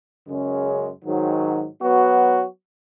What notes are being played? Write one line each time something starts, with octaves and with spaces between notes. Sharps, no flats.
F#2 C#3 G#3 C#4
G#2 D#3 F#3
F#3 B3 F#4